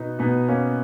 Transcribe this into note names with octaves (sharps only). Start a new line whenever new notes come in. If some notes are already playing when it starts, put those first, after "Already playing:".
Already playing: B2 B3 D#4
B2 B3 D#4
A#3 C#4